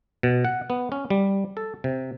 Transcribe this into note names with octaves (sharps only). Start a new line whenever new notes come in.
B2
F#5
B3
C#4
G3
A4
C3